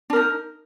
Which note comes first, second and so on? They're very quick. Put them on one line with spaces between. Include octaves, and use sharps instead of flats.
D4 A#4 D#4